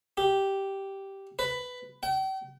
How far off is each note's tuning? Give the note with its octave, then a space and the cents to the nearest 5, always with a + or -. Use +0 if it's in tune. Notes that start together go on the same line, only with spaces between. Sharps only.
G4 -5
B4 +10
G5 -40